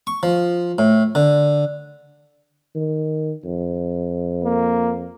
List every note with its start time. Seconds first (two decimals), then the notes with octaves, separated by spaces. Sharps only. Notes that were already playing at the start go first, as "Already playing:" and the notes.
0.07 C#6
0.23 F3
0.78 A2
1.15 D3
2.75 D#3
3.44 F2
4.44 A#3